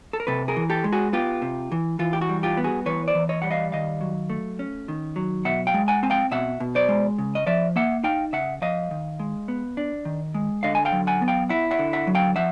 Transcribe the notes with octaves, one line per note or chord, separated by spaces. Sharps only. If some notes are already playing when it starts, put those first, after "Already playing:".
A4
A#4
C3 A4 B4
G#4 A#4
E3
G4 A4
G#3
F#4 G#4
B3 F4 G4
C3
E3
E3 F4
G4
F#4
G3
F4 G4
B3
F#4 G#4
E3 B4 C#5
C5 D5
E3
C#5 D#5
G3 F#5
D#5 F5
D#3 D#5 F5
F#3
A3
C#4
D#3
F#3
B2 E5 F#5
F5 G5
G#3
F#5 G#5
C4 G#5
F5 G5
B2 E5 F#5
B2
C5 D5
G#3
C#3
D#5
F3 D5 E5
A#3 E5 F#5
D#4 F5 G5
C#3 E5 F#5
F3 D#5 F5
D#3
G#3
B3
D4
D#3
G#3
D3 D#5 F5
G#5
F5 G5
F#3
F#5 G#5
B3
F5 G5
E4 E5 F#5
E5 F#5
D3
E5 F#5
F#3
F5 G5
F3 E5 F#5